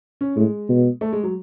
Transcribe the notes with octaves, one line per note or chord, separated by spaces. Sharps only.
C#4
A2 G#3
B2
A3
G#3
F#3